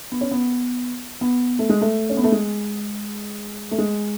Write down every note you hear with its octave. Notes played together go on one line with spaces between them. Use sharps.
B3
C#4
B3
B3
A3
G#3
A3
C#4
B3
A3
G#3
A3
G#3